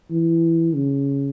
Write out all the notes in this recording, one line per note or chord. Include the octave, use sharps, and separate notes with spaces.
E3
C#3